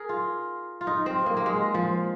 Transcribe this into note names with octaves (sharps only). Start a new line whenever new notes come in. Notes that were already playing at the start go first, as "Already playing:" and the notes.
Already playing: G#4 A#4
F4
F4
D#4
C4
A#3
A#3
G#3
F3